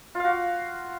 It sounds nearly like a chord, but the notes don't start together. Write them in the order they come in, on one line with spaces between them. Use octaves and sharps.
F4 F5 F#4